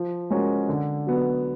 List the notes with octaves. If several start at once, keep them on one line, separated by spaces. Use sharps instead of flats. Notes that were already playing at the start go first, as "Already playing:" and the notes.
Already playing: F3
G#3 C#4 F#4 A#4
D3
F#3 B3